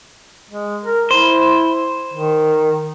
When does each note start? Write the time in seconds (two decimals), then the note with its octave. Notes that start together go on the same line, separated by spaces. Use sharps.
0.51 G#3
0.84 A#4
1.11 E4 C5
2.13 D#3